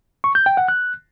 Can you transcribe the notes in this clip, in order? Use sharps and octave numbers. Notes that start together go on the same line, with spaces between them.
C#6
G6
G5
F#5
F#6